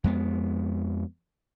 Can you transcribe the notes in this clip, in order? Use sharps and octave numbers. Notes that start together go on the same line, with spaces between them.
F2 G#3 B3